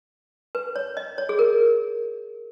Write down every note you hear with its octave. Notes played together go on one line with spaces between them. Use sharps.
B4
C#5
D#5
C#5
G#4
A#4